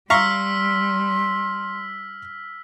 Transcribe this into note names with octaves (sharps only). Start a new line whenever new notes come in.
G3 F5 A#5 C6 C#6 E6 F6 B6